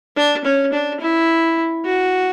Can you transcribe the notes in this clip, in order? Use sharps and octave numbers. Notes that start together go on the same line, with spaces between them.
D4
C#4
D4
E4
F#4